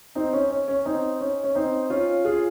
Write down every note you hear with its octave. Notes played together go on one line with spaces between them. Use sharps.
C4 D#4
C#4
C#4
C#4
C4 D#4
C#4
C#4
C4 D#4
C#4 F4
F4 G#4